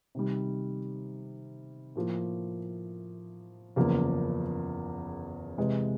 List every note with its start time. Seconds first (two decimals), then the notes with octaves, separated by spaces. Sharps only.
0.15 C3 D#3 G3
1.96 A2 F3 A#3
3.76 F#1 E2 C#3 F3 A#3
5.58 C3 E3 G#3 B3